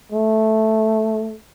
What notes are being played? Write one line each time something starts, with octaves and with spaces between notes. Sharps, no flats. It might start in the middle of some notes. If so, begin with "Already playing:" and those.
A3